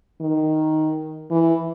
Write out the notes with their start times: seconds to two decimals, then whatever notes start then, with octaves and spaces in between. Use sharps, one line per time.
0.21 D#3
1.31 E3